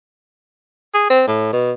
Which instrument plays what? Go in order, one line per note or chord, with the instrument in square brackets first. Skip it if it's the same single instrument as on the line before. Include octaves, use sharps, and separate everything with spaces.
[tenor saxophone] G#4
C4
A2
B2